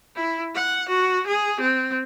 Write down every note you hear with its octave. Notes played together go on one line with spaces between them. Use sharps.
E4
F#5
F#4
G#4
C4